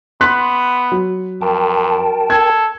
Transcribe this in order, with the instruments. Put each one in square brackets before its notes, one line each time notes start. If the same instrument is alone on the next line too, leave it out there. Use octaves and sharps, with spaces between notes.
[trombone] B3 [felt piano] C6 F#6 B6
[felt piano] F#3
[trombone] F2 [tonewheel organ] A#4 G5 A5
[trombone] A4 [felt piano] G#6